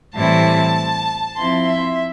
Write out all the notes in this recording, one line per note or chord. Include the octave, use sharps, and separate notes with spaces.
A2 E3 G3 C4 E4 A5
F3 C4 E4 C6
E5